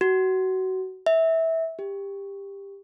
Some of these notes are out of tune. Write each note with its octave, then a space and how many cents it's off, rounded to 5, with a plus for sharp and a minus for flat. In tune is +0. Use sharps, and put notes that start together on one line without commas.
F#4 +25
E5 -20
G4 +15